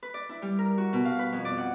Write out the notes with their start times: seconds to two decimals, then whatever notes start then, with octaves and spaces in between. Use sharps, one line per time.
0.03 B4
0.14 D5
0.29 E4
0.42 G3
0.59 A#4
0.78 F#4
0.93 B2
1.05 F5
1.19 B4
1.33 F2
1.45 D5
1.58 F#5